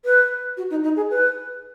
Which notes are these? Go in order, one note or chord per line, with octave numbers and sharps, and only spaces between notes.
B4
F#4
D#4
D#4
G#4
B4